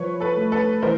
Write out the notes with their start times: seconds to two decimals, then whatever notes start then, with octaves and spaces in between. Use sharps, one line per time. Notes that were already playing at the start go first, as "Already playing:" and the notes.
Already playing: F3 B4 C#5
0.20 A4 B4
0.37 A3
0.52 A4 B4
0.83 E3 A#4 C5